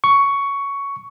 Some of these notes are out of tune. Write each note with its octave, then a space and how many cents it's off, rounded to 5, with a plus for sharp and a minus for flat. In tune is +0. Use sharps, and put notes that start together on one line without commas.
C#6 +10